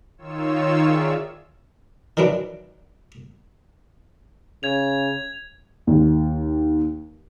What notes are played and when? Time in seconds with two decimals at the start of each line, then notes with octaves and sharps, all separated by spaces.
0.18 D#3 F4 C#5 E6
0.84 G#4 D5 E5 F5
2.17 D#3 E3 F#3 D4 E4
4.63 C#3 G#6 F7
5.87 D#2